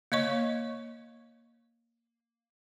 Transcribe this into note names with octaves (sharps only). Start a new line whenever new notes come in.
A#3 C#5 D#5 C#6